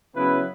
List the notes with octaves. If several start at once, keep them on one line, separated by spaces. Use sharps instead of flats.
C#3 F#3 B3 E4 B4